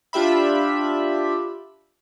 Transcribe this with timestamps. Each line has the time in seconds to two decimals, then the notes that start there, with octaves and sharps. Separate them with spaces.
0.13 D4 F4 G4 E5 B5